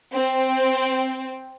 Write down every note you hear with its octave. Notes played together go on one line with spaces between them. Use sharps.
C4